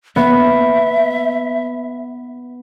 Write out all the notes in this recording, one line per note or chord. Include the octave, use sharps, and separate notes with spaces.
B3 E5